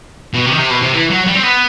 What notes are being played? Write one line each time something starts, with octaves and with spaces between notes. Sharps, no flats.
B2
C3
D#3
C3
B2
C3
E3
F#3
G3
C4
B3